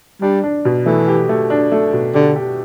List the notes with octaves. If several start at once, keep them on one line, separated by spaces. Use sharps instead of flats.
G3 D4
D4
B2
E3 A3
G4
A3
D4
A3
B2
D3 G4
G4